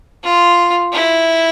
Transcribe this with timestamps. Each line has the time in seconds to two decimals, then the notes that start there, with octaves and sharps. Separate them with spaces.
0.24 F4
0.94 E4